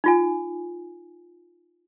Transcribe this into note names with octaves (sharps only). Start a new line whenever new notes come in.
D#4 F4 G#5